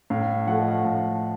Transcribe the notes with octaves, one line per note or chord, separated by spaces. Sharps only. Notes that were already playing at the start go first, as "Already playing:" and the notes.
A2 F5
F3 A3 F#5
D#5
F5
F#5
A2 A5